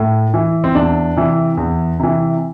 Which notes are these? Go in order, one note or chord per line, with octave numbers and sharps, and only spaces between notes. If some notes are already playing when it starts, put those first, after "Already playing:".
Already playing: A2
E3
C4
E2 D4
C3 E3
E2
C3 E3